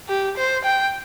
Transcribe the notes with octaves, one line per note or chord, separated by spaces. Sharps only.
G4
C5
G5